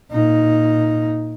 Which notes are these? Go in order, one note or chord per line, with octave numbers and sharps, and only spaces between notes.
A#2 D#4